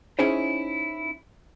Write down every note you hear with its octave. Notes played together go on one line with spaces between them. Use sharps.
C#4 D#4 E4 G#4 C5 C#5